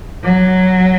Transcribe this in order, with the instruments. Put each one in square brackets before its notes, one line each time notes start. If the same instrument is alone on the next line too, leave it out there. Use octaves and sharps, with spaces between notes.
[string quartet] F#3